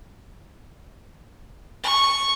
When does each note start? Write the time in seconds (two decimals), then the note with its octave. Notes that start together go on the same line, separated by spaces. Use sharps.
1.84 C#6